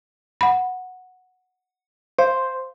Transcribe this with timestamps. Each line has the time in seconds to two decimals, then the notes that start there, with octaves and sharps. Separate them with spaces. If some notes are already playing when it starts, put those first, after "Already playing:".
0.41 F#5 B5
2.19 C5 F5